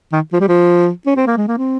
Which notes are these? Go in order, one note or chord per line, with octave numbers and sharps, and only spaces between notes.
D#3
F3
G3
F3
C#4
C4
A#3
G#3
A#3
C4